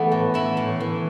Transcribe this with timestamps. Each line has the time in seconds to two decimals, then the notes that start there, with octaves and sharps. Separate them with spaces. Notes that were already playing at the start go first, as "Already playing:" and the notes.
Already playing: E3 A3 B3
0.11 A2
0.34 E3 E4
0.57 A2
0.80 E3